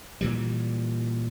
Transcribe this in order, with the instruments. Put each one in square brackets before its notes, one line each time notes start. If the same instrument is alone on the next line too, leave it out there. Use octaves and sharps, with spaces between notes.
[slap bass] A#2 E3 G3